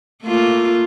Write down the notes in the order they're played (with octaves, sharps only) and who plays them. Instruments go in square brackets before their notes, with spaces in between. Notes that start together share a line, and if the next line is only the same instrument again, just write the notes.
[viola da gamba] A3 A#3 F4